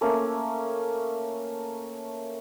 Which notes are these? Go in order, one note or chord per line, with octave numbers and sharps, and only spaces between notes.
A3 A#3 C#4 C#5